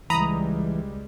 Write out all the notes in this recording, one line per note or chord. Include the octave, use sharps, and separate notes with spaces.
C#2 E3 G3 G#3 A#5 B5 D#6